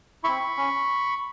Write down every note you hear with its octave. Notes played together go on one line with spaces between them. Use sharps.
C4 E4 B5 C#6
C#4